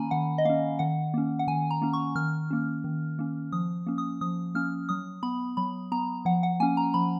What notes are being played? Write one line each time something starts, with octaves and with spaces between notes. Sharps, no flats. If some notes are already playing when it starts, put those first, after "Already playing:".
Already playing: D#3 A#3 C#4 G#5 A#5 B5
D#3 F#5
D#5
A#3 C#4 F5
D#3 F#5
A#3 C#4
F#5
D#3 G#5
A#5
A#3 C#4
C#6
D#3 F6
A#3 C#4
D#3
A#3 C#4
F3 D#6
A#3 C#4
D#6
F3 D#6
A#3 C#4 F6
F#3 D#6
B3 B5
F#3 B5
B3 A#5
F3 F#5
F#5
A#3 C#4 G#5
A#5
F3 B5